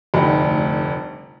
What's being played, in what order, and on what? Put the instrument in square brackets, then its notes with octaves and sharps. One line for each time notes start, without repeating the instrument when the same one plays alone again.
[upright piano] F1 D2 G2 D#4